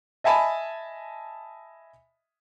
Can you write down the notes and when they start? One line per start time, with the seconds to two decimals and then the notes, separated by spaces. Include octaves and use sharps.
0.24 D#5 E5 G#5 A5 B5